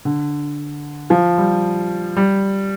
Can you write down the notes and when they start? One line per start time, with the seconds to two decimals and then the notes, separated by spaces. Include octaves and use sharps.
0.05 D3
1.10 F3
1.38 G3
2.16 G3